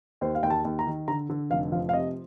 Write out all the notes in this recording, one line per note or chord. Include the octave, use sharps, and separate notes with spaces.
D#2 C5
F5
D#2 G5
A5
D#2
A#5
D#3
D3 A#5
D3
F1 F5
F3 F5
F5
C3 D#5